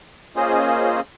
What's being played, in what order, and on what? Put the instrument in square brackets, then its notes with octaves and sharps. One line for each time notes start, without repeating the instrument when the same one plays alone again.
[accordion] A#3 C#4 F4 G#4 C5 D#5